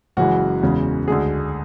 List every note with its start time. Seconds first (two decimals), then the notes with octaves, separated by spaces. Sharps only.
0.17 F#1 F#2 C#3 E3 G#3 F#4
0.62 E2 C#3 E3 G#3
1.07 D2 D3 G#3 G#4